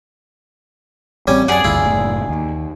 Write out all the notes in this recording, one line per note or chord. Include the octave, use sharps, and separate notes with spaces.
A1 G3 C4 C#4 G#5
F#2 G#4 D5 F#5 A5
G#1 D2 G2 E4 F4
F#1 A2
D#2